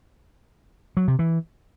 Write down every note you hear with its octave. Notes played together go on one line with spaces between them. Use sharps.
F#3
C3
E3